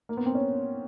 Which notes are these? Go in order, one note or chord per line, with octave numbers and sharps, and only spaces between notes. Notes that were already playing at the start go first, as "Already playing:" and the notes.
A#3
B3
C4
C#4